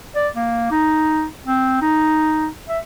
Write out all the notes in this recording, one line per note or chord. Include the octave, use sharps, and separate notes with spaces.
D5
A#3
D#4
C4
D#4
E5